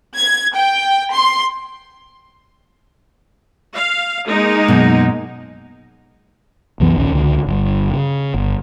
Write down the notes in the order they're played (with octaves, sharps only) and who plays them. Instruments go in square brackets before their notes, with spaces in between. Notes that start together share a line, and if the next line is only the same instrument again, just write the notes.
[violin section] G#6
G5
C6
[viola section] F5
G#3 A#3 D#4
[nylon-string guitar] F#2 B2
[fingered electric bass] C2 F#2 E3 B3
A#1 D#2 C#4
C#2 D3
G1 G2
C#3
G1